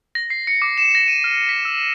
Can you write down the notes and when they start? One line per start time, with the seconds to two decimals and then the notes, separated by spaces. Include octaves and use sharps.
0.15 A#6
0.30 C7
0.47 C#7
0.62 D6
0.78 E7
0.95 A#6
1.08 D#7
1.24 F6
1.49 B6
1.65 E6